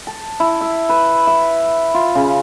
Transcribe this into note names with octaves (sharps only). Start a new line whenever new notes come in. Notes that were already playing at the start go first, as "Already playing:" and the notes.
A5
E4
E5
B4
E5
F4
C#3